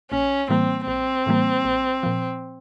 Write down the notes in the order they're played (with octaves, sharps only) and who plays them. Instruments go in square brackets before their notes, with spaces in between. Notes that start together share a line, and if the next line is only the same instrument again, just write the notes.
[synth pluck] A#1 [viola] C#4
[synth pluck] A2 E3 G3 A#3 [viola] C4
[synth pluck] A#1 [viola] C4
[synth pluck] A2 E3 G3 A#3
A#1
A#2 F3